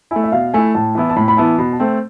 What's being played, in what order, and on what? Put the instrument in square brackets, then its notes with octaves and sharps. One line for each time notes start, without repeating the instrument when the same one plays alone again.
[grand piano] A3 E4 [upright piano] G#5
[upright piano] E5
[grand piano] B2 [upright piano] F5
[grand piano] A3 E4 [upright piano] G#5
[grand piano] A2 [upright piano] A5
[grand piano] E3 B3 E4
[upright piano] A5
[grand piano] A2 [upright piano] B5
[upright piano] B5
[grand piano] E3 B3 E4 [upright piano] A5
[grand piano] B2 [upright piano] B5
[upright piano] A5
[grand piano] A3 C4